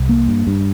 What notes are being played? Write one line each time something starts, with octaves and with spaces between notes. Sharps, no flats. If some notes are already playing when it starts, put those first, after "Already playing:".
Already playing: C2
A#3
G2
G2